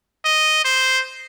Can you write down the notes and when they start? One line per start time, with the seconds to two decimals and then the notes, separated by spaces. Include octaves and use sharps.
0.25 D#5
0.65 C5